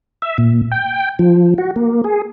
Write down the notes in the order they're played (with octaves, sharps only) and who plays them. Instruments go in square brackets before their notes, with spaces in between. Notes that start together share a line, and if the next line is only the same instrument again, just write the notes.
[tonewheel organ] E5
A#2
G5
F3
F#4
A#3
G#4